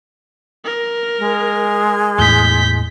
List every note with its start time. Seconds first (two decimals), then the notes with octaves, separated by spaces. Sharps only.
0.65 A#4
1.19 G#3
2.18 E2 A2 G6 B6